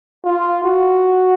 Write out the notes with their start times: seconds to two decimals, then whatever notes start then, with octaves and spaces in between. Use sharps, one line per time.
0.24 F4
0.64 F#4